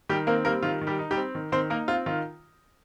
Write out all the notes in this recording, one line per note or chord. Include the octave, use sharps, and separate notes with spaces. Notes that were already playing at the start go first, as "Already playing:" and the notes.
D#3 G3 G4
A#3 C4 A#4
G3 A#3 A#4
D#3 F4
D#3
G3 G4
D#4
G3 G4
C4
D#3
D#3 C4 C5
A#3 D#4 A#4
C4 F4
D#3 F4